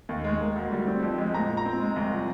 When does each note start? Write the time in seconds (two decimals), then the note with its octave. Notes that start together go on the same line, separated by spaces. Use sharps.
0.09 D#2
0.24 G#3
0.41 A#3
0.56 D2
0.72 G3
0.87 C4
1.02 F2
1.18 G#3
1.34 A#2 A#5
1.49 A#2
1.57 A#5
1.65 C4
1.81 G#3
1.96 C2
2.12 F3